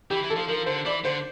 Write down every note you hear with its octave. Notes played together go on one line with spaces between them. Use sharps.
E3 G4
E3
A4
F3
F3 A#4
D3 C5
E3 D5
D3 C5